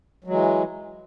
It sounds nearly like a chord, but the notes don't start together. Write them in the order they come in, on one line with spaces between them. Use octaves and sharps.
F#3 G#3 E3